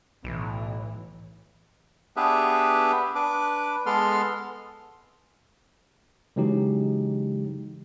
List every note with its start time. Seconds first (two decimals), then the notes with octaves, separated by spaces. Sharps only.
0.24 B1 A2 E3
2.17 B3 D4 G4 G#4 B4 E5
3.15 D4 B4 D6
3.86 G#3 B3 A4 C6 F6
6.36 C#3 E3 F#3 G#3 D#4 G4